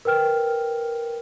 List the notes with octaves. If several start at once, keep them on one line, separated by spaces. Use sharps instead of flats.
A#4 B4 G5 F6